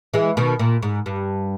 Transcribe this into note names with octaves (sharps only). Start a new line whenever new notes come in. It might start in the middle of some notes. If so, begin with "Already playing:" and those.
E3 G#3
B2 D#3
A#2
G#2
G2